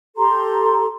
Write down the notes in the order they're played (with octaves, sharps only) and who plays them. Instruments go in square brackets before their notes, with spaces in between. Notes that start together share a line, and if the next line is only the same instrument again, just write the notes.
[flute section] G4 A4 A#5 C6